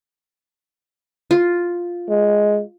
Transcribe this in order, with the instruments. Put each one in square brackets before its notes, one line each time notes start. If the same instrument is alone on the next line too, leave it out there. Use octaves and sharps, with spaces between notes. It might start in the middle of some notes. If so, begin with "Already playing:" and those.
[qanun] F4
[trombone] G#3